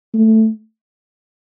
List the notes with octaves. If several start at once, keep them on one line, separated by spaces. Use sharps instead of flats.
A3